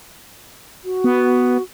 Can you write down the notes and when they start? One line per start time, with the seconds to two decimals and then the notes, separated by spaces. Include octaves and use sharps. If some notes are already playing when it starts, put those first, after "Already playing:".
0.84 F#4
1.04 B3